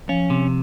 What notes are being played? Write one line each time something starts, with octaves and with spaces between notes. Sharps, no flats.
F3 C#4
C3